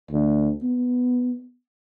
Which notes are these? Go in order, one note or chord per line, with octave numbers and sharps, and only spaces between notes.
D2
B3